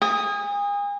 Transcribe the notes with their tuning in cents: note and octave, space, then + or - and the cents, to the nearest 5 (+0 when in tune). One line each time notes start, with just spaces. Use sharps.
G#5 -40 D#6 +0